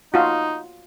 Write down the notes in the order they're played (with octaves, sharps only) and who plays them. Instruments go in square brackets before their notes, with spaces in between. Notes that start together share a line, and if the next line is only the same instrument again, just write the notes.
[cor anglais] D#4 [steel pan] F4 F#4